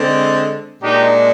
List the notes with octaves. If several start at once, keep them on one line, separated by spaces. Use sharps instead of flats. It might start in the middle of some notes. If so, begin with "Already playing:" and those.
Already playing: D3 G#3 C4
A#2 G#3 D4 D#4 G4